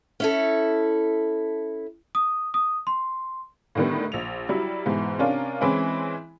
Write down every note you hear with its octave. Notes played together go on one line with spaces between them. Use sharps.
C#4 E4 A4
D#6
D#6
C6
A2 D3 D#3 G3 B3
A#1 F7
F#3 G3 E4
G#2 B2 E3
C3 C#4 D4 F4 A#4
E3 G#3 C4 C#4 E4